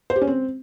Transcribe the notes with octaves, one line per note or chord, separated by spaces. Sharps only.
C5
G4
C#4
C4